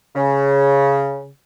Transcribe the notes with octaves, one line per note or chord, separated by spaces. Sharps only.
C#3